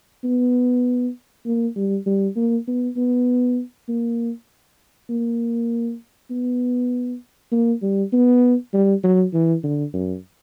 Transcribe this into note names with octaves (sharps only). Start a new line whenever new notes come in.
B3
A#3
G3
G3
A#3
B3
B3
A#3
A#3
B3
A#3
G3
B3
G3
F#3
E3
D3
F#2